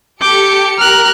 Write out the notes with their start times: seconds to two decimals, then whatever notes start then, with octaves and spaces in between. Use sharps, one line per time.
0.21 G4 A4 D6 G6 C#7
0.79 G4 A#4 F6 F#6